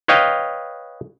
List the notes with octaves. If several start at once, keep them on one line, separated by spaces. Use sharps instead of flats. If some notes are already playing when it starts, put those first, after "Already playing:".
B4 C#5 D#5 F5 G5